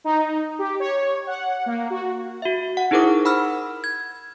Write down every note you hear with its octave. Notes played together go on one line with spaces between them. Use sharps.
D#4
G4
C#5
F#5
A#3
F#4
F#4 E5
F#5
D#4 E4 G#4 A#4 C5 D6
F#5 B5 E6 F6
G#6